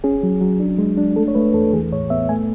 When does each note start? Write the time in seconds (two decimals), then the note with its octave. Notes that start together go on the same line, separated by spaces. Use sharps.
0.04 C#4 G#4
0.23 F#3
0.41 F#3
0.60 D4
0.78 G#3
0.97 D4
1.16 A3 A4
1.28 C#5
1.35 A3 B4
1.54 E2 A4
1.73 E3 G#4
1.93 A2 C#5
2.10 B3 E5
2.29 A3 G#5